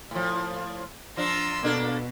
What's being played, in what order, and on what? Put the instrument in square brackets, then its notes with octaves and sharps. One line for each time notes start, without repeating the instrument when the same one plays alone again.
[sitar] A2 F3
[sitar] F3 D4 [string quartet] A#5 C6 E6
[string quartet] B2 [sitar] A#3 D4 A4